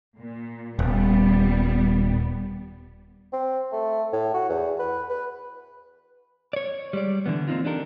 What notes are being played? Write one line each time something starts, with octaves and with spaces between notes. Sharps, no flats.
A#2
D#1 G3 B3
C4
A3
A2
F#4
E2
B4
B4
C#5 D5
G3 G#3 D5
D3 E3 B3
A#3 C4 D4 D#4 F4
D4 D#4 G4 A4 A#4